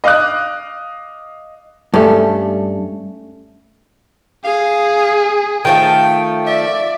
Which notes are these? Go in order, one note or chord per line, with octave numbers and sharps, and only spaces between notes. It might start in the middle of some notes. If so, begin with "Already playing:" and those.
D#5 F5 D6 F#6
G2 A3 C#4
G#4 F5
D#3 F3 A3 G5
D5 E5